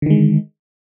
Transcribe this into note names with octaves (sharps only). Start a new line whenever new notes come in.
D3 D#3 G#3